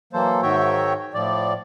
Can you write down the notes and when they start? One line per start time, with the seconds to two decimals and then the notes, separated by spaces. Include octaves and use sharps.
0.13 E3 F#3 A#3 A4 C5
0.42 G#2 D#3 F#4 C#5 E5 G5
1.14 A2 F3 D5